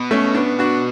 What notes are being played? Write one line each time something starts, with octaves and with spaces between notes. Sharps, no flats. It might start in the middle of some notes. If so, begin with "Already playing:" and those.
Already playing: B2
A3 C#4
B3 D4
D4 F#4